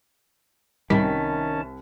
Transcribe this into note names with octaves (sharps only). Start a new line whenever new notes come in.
C2 D#3 G3 C#4 A5 B6